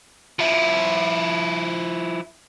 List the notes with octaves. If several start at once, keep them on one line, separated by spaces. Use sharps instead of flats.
F3 E4